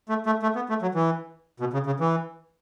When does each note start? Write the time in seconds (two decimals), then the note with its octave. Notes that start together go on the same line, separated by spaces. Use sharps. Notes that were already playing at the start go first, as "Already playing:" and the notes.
0.09 A3
0.26 A3
0.43 A3
0.56 B3
0.69 A3
0.82 F#3
0.95 E3
1.60 B2
1.73 C#3
1.86 C#3
2.00 E3